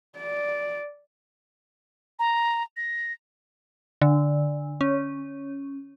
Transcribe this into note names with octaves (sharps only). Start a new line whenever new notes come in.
D5
A#5
A#6
D3
C#4